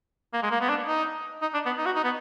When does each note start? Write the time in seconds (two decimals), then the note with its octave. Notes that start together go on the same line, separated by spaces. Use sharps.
0.33 A#3
0.43 G#3
0.51 A#3
0.61 B3
0.69 D4
0.87 D#4
1.42 D#4
1.54 D4
1.66 B3
1.78 D#4
1.86 F#4
1.96 D#4
2.04 B3